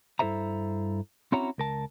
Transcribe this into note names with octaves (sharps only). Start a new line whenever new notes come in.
G2 E4 A4 C5 E5 A#5
C4 C#4 E4 F#4 C#5 A#5
C#2 A#4 A5